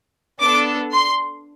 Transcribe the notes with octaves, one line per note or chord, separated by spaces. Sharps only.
B3 D4 A4 D6
C6